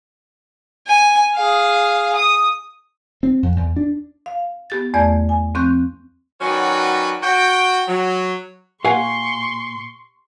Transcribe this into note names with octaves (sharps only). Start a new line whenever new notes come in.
G#5
G#4 F5
D#6
C4
F2
E2
D4
F5
B3 G4 A6
E2 A3 D5 G#6
G#5
F3 C4 C#6 F#6 G6
D#3 F#3 C#4 F#4 B4 D5
F#4 G5
F#3
A#2 G4 F5 F#5 G#5 C6 C#6